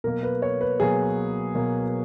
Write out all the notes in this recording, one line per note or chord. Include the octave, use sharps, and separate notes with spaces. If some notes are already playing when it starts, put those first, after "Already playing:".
B2 F#3 A#3 A#4
B4
C#5
B4
B2 F#3 A#3 G#4
B2 F#3 A#3